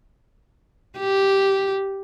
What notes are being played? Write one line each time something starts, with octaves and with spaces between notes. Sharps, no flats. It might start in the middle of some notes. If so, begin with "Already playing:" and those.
G4